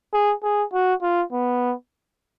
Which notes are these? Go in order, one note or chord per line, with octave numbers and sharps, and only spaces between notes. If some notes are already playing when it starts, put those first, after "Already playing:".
G#4
G#4
F#4
F4
B3